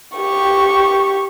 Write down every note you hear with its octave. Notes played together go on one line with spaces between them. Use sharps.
G4 C#6